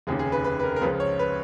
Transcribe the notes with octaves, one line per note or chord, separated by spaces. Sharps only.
F1 D#2 C#3 G#4
G#4
B4
B4
B4
A#4
A#4
C#2 C#3 F3 B4
C#5
B4